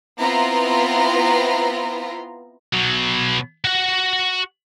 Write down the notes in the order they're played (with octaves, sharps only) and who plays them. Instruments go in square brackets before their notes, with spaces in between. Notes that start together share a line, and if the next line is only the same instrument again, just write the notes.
[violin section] B3 C4 E4 F4 A#5
[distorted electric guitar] B2 F#3
F#4 F#5